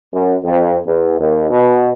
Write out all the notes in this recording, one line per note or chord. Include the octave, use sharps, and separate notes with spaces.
F#2
F2
E2
D#2
B2